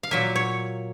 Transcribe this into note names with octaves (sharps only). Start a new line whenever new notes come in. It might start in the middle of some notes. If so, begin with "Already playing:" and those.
F5
A#2 F#3 A#3 E5
C#5